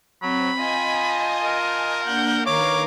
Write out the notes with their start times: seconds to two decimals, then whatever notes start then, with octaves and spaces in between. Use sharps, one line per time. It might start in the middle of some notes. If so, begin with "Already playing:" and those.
0.23 F#3 C4 B5
0.59 F4 D#5 G5 G#5 G#6
0.99 A5 G6
1.44 A#4
2.04 A#3 D4 F#5 G6
2.46 D#3 A#4 B4 C#5 F5 D6